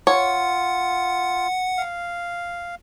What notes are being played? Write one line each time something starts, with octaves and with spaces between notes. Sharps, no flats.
F4 C#5 F#5
F5